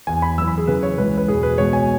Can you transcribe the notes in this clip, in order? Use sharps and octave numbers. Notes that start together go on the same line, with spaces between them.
E2 E3 G#5
B5
F#2 E3 E6
B5
G#4
F#2 C#3 E3 B4
C#5
C#2 C#3 E3 B4
B4
E2 B2 G#4
B4
C#2 B2 C#5
G#5